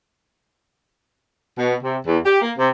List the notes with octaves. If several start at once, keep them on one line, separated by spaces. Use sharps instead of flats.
B2
C3
E2
G4
A#3
C3